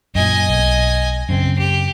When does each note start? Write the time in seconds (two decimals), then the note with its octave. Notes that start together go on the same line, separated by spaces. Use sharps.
0.15 F#2 A#2 D#5 G#5
0.49 B1
1.29 F#2 C#3 C4
1.58 G4